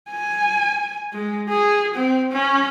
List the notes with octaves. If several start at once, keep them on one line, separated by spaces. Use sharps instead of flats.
G#5
G#3
G#4
C4
C#4